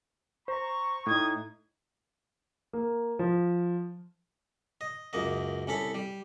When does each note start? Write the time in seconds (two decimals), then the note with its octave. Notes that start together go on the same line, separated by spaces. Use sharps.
0.48 C5 A#5 C#6
1.06 A2 D#4 D#6 G#6
2.73 A#3
3.19 F3
4.81 D#5
5.13 C#2 F#2 A#3 D#5
5.67 C2 C#4 A4 B5
5.94 G3